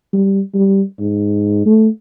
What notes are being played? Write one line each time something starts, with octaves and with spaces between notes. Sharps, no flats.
G3
G3
G#2
A3